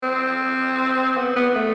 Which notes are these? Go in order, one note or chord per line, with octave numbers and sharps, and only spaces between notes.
C4
B3
B3
A3